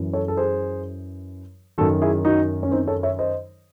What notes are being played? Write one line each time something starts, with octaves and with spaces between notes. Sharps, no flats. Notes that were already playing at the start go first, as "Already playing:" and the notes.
Already playing: F#2 E3
A4 C#5
A4
G#4 C5
F#2 D#3 F#4 A4
E4 G#4
D#4 F#4
C#4
C4 D#4
A4 C#5
C#5 E5
C5 D#5